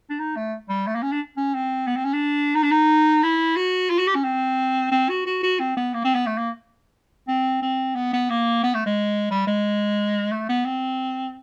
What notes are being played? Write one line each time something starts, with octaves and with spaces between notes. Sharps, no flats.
D4
D#4
A3
G3
A3
A#3
C#4
D4
C#4
C4
B3
C4
C#4
D4
D#4
D4
D#4
E4
F#4
F4
F#4
G4
C#4
C4
C4
F#4
F#4
F#4
C4
B3
A#3
C4
B3
A3
A#3
C4
C4
B3
B3
A#3
B3
A3
G#3
G3
G#3
A3
B3
C4